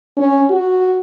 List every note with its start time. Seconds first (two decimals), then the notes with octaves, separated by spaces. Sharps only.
0.17 C#4
0.50 F#4